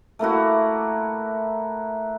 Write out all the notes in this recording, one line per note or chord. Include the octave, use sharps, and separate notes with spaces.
A3 A#3 E4 F#4